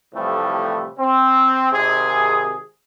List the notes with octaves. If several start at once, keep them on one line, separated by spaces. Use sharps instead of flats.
A2 C3 E3 F3 G3 A3
C4
G#1 C3 G#4